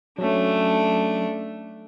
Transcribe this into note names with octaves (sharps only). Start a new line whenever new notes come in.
F#3 A3 C#4 D4